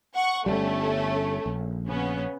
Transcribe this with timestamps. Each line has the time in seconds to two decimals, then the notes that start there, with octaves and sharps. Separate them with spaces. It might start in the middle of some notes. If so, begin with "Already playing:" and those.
0.15 F#5 C#6
0.46 G1 C2 G3 A3 C#4
1.46 A#1
1.88 C#3 B3 C#4